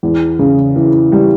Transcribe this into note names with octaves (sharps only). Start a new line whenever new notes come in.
E2
C#3
E3
G3